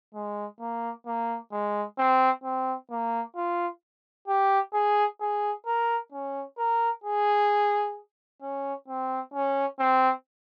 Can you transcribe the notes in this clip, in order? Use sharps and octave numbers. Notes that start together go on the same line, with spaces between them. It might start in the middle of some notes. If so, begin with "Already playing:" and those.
G#3
A#3
A#3
G#3
C4
C4
A#3
F4
G4
G#4
G#4
A#4
C#4
A#4
G#4
C#4
C4
C#4
C4